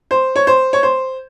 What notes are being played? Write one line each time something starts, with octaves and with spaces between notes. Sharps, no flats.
C5
C#5
C5
C#5
C5